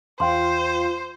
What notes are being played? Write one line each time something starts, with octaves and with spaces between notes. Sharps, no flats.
E2 F4 C5 F5 G5 C6